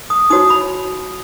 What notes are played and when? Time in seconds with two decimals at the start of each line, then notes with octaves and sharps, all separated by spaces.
0.10 D#6
0.30 D#4 F#4 C#5 D#6
0.50 B5